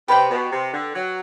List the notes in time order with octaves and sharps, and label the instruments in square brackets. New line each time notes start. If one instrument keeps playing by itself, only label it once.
[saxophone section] C3 [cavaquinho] G4 B4 D5 G5
[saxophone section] B2
C3
D3
F#3